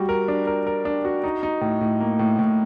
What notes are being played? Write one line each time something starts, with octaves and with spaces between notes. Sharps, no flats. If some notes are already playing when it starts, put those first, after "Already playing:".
Already playing: G3 F#4
A#4
D4
A#4
A#4
D4
F#4
D#4
D#4
A2
A2
A#3
A2
A2